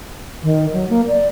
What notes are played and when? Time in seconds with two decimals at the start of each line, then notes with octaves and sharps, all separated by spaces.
0.43 D#3
0.73 F#3
0.90 A#3
1.08 D5